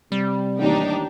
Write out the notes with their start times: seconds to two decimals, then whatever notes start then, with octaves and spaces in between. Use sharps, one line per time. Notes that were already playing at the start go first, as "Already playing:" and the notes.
0.12 C3 G3
0.59 A1 D#2 D4 D#4 G4